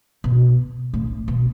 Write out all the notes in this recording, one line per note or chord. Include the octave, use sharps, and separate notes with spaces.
B2
A2
B2